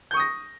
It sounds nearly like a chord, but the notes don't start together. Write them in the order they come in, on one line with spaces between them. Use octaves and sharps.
G6 C#6 D#6 A#6